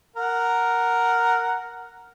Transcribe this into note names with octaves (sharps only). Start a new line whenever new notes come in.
A#4 F#5